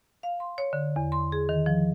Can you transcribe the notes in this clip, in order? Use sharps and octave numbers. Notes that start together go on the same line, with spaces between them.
F5
C6
C#5
D3
E2
C6
G#4
D#3
F3